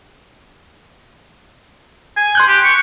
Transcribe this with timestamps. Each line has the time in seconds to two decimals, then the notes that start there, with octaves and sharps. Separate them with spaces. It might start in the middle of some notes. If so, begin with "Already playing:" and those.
2.17 G#5
2.35 C6 F#6 G6
2.48 G4
2.64 C#6